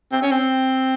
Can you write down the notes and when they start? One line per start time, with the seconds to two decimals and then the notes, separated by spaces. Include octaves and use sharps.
0.12 C4
0.22 C#4
0.32 C4